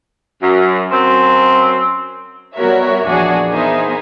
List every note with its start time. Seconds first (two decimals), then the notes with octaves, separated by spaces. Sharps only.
0.43 F#2
0.91 F#2 C4
2.56 G3 B3 F#4 A#4 C#5 E5
3.06 A#1 E2 D4 F#4 G#4
3.51 B3 D#4 G#4 A#4 C5 E5